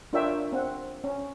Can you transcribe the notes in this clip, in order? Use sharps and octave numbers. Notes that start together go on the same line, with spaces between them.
D4 F4 A#4 C#5 E5 G5
C4 F#5
C#4